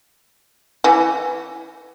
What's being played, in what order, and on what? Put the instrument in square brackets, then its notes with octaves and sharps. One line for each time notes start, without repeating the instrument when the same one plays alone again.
[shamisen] E3